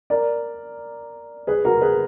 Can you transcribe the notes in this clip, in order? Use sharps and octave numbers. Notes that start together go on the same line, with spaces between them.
A#4 D5
G#4 B4
F#4 A#4
G#4 B4